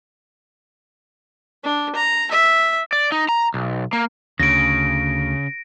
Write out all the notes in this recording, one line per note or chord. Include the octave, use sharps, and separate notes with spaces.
D4
A#5
E5
D5
D#4
A#5
B1
A#3
D2 C#3 A#6 D7